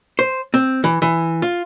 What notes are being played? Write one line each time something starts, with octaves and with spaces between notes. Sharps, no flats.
C5
C4
E3
E3
F4